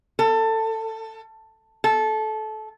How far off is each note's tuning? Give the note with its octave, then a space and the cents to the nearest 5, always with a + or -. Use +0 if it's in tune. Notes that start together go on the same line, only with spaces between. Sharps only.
A4 +20
A4 -20